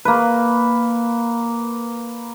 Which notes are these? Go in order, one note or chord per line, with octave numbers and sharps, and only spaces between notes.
A#3 B4